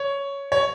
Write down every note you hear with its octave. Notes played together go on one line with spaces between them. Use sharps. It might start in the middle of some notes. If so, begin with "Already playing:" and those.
Already playing: C#5
C#5